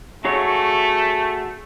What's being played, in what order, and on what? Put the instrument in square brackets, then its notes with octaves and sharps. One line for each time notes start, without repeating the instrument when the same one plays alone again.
[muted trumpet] A3 [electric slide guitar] F#4 G#4 C#5